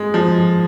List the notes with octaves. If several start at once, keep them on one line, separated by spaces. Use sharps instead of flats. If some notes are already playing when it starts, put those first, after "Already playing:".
Already playing: G#3
F3